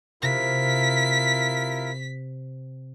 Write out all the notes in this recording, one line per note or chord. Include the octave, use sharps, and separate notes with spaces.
C3 E4 F4 A#4 B6